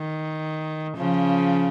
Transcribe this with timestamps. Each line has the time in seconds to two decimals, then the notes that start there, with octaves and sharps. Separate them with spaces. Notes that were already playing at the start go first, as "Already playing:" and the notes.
Already playing: D#3
0.97 C#3 F3